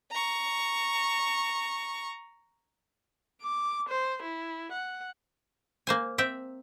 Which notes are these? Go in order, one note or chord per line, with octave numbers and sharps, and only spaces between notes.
A#5 C#6
D6
C5
E4
F#5
A#3 C5 G#5
C4 E5 G5